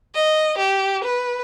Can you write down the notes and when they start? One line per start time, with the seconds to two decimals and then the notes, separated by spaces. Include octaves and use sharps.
0.15 D#5
0.59 G4
1.04 B4